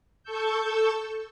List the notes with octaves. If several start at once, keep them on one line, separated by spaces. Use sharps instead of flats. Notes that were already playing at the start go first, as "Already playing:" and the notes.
A4 A5 C#6 E6 G6